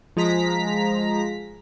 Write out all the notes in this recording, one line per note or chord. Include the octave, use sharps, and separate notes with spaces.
F3 G#3 A#5 B6